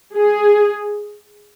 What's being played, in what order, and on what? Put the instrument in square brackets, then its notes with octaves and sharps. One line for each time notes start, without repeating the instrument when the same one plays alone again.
[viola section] G#4